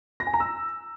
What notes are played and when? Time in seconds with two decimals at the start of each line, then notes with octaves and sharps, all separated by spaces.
0.20 A#6
0.27 G#5
0.33 A#5
0.40 E6